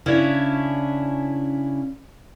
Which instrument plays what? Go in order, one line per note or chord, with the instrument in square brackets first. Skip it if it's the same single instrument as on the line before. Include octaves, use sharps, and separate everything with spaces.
[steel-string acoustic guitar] C#3 C#4 D4 E4